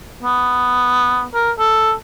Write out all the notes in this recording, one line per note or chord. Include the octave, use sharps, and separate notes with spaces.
B3
A#4
A4